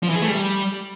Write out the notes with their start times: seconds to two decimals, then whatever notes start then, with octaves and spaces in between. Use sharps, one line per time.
0.03 F3
0.09 E3
0.15 G#4
0.22 A3
0.28 G3